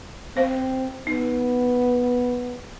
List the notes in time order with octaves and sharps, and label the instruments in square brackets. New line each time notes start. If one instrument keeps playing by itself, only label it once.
[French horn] C4 [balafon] C5 F5
[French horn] B3 [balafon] D#4